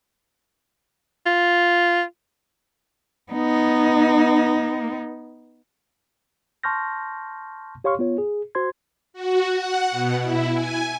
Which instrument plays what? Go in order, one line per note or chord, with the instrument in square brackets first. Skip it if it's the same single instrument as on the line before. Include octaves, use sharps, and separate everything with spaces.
[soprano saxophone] F4
[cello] B3 D#4
[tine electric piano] A5 C6 C#6 F6 G6 A#6
G4 C#5 F5 C6 C#6 F6
B3 F4 C#5
G#4
F#4 C5 C6 G#6
[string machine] F#4
F#5
B2
E4
G#5